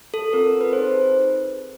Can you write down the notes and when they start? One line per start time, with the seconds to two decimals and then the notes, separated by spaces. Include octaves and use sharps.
0.14 A4
0.33 C4 F4 A4 A#4
0.61 B4
0.73 C4 D#4 G#4 C5